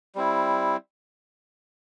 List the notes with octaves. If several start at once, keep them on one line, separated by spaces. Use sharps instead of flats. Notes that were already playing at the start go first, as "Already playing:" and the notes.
G3 C4 E4